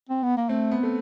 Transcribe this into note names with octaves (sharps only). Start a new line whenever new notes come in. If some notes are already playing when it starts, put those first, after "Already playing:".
C4
B3
A#3
A3 C4
B3
A3